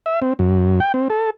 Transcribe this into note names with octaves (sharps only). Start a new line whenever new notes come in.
E5
C4
F#2
G5
C4
A4